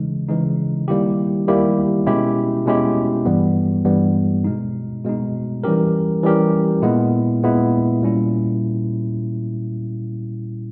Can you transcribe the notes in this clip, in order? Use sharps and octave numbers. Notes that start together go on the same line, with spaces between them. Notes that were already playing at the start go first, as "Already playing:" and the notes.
Already playing: C#3 E3 G#3 D#4
C#3 E3 G#3 D#4
D#3 G3 A#3 E4 G4
D#3 G3 A#3 E4 G4
B2 G#3 C#4 E4 G4
B2 G#3 C#4 E4 G4
G2 E3 G3 B3
G2 E3 G3 B3
B2 G#3 D#4
B2 G#3 D#4
E3 G3 C#4 G4 A#4
E3 G3 C#4 G4 A#4
A#2 G#3 B3 E4
A#2 G#3 B3 E4
A#2 G3 C#4 E4